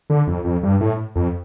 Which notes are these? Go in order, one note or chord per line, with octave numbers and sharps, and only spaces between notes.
D3
F2
F2
G2
A2
F2